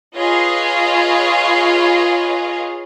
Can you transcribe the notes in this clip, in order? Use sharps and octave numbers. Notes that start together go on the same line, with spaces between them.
F4 G#4 B4 C#5 D#5 F5